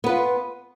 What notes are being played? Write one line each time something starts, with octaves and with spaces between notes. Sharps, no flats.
B3 F4 B4